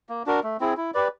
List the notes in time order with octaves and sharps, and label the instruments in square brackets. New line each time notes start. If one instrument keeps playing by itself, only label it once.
[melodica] A#3
D4 F#4 A#4
A3
C4 E4 G#4
E4
G4 B4 D5